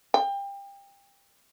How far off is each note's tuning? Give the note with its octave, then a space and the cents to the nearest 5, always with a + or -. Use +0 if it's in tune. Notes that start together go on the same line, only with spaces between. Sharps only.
G5 +25